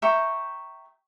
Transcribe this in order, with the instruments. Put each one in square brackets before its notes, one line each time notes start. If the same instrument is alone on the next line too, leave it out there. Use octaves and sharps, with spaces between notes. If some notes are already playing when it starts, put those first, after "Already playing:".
[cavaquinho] E5 G5 A#5 C#6